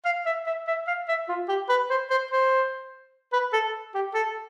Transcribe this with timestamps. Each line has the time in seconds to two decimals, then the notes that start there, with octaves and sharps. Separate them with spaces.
0.05 F5
0.26 E5
0.46 E5
0.67 E5
0.87 F5
1.08 E5
1.29 F4
1.48 G4
1.69 B4
1.90 C5
2.10 C5
2.31 C5
3.33 B4
3.53 A4
3.95 G4
4.14 A4